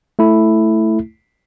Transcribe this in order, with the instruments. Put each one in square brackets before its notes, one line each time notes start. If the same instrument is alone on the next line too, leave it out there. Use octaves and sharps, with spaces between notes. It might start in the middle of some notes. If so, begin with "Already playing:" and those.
[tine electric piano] A3 E4